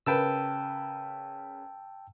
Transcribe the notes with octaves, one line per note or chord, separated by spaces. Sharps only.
C#3 A#4 B4 G5 A5 E6